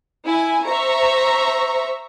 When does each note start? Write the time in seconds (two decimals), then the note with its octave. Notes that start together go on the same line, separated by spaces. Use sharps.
0.25 E4 G#5
0.65 C5 E5 A#5 C#6